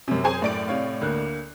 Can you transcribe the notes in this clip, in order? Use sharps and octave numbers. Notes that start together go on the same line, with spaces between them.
F#2 C3 C#4
G#4 C5 G#5
A2 D5 D7
C3 C#5 F5
D2 A#3 F#6